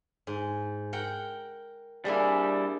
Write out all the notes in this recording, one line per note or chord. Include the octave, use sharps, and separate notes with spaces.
G#2
A#4 F#5 G5
G3 A#3 D4 E4 G#4